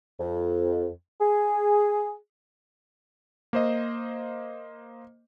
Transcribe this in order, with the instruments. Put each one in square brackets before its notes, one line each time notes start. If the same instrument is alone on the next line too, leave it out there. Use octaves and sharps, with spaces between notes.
[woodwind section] F2
G#4
[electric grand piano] A#3 C5 D#5